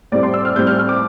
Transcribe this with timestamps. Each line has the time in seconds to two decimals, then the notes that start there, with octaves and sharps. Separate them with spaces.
0.12 A2 G3 C4 D5
0.23 C6
0.34 E6
0.45 F6
0.56 A2 G3 C4 G6
0.67 F6
0.78 F6
0.89 D6